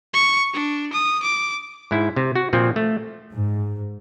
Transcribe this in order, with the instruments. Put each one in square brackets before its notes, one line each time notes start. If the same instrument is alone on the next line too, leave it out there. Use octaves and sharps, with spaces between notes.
[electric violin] C#6
D4
D#6
D6
[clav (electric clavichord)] G#2 E4
C3
F#4
A#2 F3 C4
A3
[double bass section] G#2